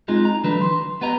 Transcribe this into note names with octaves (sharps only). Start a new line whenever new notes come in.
G#3 C4 D#4 F4 G#4
A#5
D3 E3 F#3 A3 D4 B4
C6
B3 G4 B4 D#5 A#5